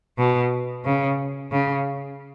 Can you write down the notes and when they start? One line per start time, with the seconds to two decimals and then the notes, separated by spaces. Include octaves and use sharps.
0.18 B2
0.85 C#3
1.51 C#3